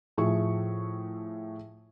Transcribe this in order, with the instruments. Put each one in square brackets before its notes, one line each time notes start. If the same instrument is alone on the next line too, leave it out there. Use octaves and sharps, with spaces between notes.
[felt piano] A2 F3 G#4 E5 C#6